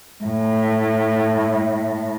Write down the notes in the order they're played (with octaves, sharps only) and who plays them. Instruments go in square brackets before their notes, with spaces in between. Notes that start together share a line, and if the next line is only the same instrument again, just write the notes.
[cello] A2